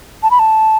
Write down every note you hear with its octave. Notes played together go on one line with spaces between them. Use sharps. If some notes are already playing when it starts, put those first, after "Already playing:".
A5
B5
A5